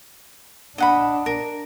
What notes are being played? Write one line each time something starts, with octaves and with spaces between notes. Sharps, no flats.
D4 D#5 F#5 B5
A#4